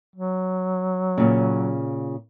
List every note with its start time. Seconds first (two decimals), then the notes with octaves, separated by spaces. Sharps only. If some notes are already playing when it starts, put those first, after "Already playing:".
0.16 F#3
1.18 A#2 C#3